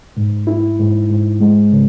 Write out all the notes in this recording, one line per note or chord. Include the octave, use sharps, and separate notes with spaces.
G#2
E4
G#2
G#2
G#3
C#3